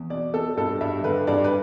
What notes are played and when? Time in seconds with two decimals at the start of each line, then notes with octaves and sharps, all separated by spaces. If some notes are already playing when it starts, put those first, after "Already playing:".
Already playing: E2
0.10 B2 D5
0.34 B2 A4
0.57 G2 A4
0.81 G2 E5
1.04 D3 B4
1.27 G2 D5
1.44 B4